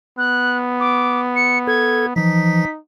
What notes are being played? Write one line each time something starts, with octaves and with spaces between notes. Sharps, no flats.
B3 F#6
D6
C#7
A4 G#6
E3 F3 D#4 B6